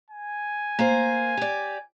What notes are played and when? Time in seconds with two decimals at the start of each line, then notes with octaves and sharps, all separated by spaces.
0.10 G#5
0.79 A#3 C5
1.37 G4 D5